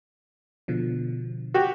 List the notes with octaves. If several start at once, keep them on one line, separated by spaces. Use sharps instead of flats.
B2 D3 F3
F#4 G4